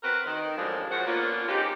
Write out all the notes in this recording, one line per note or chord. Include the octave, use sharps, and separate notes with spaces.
C4 F#4 A#4 B4
D#3
F#2 A2 D3 F3 G#3
F#2 C#3 F3 C#4 C5 F#5
A#3 B3 C#4 D4 F4
G#3 C4 D#4 G4